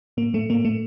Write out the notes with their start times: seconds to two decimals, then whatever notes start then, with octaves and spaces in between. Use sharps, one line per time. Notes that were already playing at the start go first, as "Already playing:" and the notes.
0.17 A2 A#3
0.33 A2 A3
0.50 A2 A#3
0.65 A2 A3